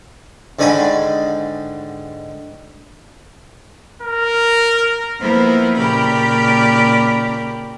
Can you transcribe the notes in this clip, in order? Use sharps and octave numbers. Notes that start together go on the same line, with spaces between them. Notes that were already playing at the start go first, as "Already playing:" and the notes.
G#2 D3 D#3 G#5 A#5 B5
A#4
F3 A#3 B3 E4 A#4 C5
A#2 C#3 G4 A#4 D5 B5